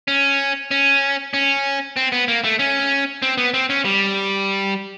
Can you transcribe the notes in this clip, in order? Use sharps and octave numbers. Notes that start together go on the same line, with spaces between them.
C#4
C#4
C#4
C4
B3
A#3
A3
C#4
C4
B3
C4
C#4
G3